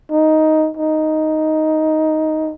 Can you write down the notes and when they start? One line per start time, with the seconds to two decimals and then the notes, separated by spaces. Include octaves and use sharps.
0.12 D#4
0.77 D#4